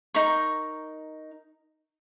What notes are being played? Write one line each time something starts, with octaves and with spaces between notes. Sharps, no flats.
D#4 A#4 C#6